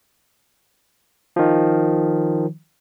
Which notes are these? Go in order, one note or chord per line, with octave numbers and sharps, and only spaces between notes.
D#3 F3